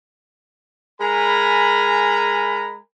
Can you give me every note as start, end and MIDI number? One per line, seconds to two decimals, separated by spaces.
1.00 2.78 56
1.00 2.78 70
1.00 2.78 80
1.00 2.78 82
1.00 2.78 83